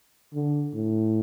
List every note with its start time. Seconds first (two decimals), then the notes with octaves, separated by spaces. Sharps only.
0.34 D3
0.75 A2